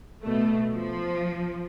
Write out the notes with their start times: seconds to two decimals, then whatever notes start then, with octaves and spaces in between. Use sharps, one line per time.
0.24 B2 A3
0.73 F3